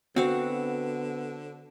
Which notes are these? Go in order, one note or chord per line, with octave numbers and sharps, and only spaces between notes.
D3 B3 C4 F#4 F5 F#5